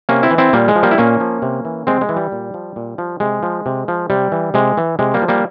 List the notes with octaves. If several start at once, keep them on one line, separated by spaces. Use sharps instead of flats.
C3 A#3 C#4
C4 E4
E3
C4 E4
A#2 G3 A#3
G#3
F3
G3 A#3
E4
A#2 A#3 C#4
F3
C3
E3
C3 G#3 C4
G#3
E3
G3
A#2
F3
A#2
F3
C3 G#3
F3
C3
F3
C3 G3
E3
C3 G#3
E3
C3 G#3
G3 A#3
F3
G3 A#3